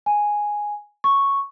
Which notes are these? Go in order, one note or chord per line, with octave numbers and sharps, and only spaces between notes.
G#5
C#6